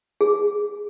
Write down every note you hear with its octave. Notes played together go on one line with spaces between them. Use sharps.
G#4